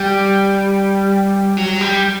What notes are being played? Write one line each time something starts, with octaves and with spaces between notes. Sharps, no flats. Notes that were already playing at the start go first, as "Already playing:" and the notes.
Already playing: G3
F#3
G3